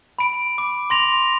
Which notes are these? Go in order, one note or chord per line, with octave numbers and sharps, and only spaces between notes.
B5 D7
D6
C6 A#6 F7